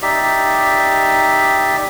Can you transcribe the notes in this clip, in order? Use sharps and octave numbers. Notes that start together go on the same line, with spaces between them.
D#4 G4 D5 E5